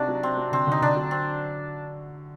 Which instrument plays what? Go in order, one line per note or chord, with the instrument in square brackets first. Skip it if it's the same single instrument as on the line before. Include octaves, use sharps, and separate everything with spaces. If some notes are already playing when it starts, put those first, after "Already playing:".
Already playing: [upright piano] C3 D#4 [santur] D4 F#4
[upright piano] F#3
[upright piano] C3 [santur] C4
[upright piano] F#3
[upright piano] D3 [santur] C4
[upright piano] D3 [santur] D#4
[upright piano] D3 [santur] D4
[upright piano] F#3
[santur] C4